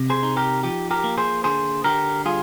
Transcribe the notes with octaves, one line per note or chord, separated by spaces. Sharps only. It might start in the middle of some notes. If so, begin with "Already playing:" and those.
Already playing: C3
G#4 C5
D#4
G4 A#4
F3 G4
G4 A#4
A#3
G#4 C5
D3 G#4 C5
D3 G4 A#4
G3 F4 G#4